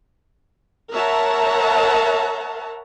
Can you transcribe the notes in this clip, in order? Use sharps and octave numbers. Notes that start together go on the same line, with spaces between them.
A#4 C#5 E5 F#5 A5 A#5